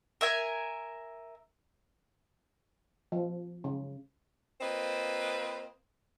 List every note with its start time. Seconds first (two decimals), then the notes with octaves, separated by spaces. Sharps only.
0.21 A#4 E5 G#5
3.12 F3
3.64 C#3
4.61 A#3 C4 F4 B4 C5 D#5